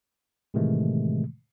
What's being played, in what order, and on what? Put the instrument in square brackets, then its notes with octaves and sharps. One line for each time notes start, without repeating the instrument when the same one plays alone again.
[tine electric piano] A2 C3 D#3 E3 G#3 A3